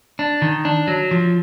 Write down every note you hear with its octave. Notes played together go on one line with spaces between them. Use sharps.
D4
D#3
D4
F#3
F3